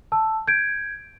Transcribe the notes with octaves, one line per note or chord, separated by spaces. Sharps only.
A5 E6
G6 G#6 D7